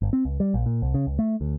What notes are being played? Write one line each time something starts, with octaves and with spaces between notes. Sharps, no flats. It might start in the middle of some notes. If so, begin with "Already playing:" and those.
G1
C4
C#2
G3
A#1
A#2
C2
C#3
C#2
A3
D2